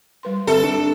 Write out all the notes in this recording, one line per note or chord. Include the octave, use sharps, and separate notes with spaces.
G3 B4 C6
G1 C4 A4 E5
D4